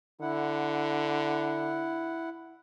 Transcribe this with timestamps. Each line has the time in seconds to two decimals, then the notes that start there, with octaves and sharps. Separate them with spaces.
0.21 D3 E4 F#5